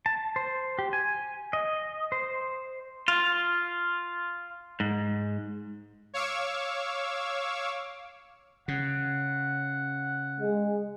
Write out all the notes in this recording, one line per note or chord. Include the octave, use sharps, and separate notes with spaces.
A5
C5
G4
G#5
D#5
C5
F4
G#2
C#5 F5 C#6 D6 E6
C#3 F#5
G#3